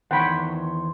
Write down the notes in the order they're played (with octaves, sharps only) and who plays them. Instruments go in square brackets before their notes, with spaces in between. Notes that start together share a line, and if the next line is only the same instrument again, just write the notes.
[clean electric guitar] E2 D#3 C#5 [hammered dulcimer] C5 [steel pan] F#5 G5 B5